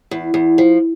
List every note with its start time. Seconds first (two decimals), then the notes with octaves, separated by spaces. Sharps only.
0.11 E2
0.34 E2
0.58 F3